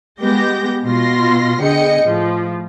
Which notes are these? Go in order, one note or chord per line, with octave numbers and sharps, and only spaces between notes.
G#3 B3 G4 G6 A#6
B2 F4 C6 A#6
D3 B3 G#4 D#5 G5 C#7
A2 F3